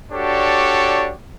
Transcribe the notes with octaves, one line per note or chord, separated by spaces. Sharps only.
D4 F#4 G4 A4 C#5 D5